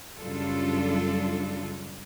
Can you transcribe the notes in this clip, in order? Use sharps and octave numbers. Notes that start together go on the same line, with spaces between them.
F#2 C#3 G3 D4 F4 A4